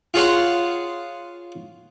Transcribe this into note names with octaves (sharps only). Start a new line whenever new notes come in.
F4 G#4 C#5 F#5 A5 C6